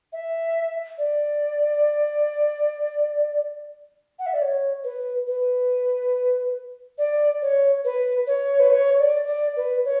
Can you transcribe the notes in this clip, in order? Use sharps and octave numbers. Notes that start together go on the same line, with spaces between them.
E5
D5
F#5
E5
D5
C#5
B4
B4
D5
C#5
B4
C#5
B4
C#5
D5
D5
B4
C#5